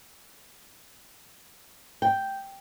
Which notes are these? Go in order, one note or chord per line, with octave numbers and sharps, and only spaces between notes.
G5